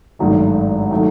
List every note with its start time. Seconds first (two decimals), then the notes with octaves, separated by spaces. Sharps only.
0.19 G#1 G2 D#3 F#3 A3
0.91 D#3 F#3 A3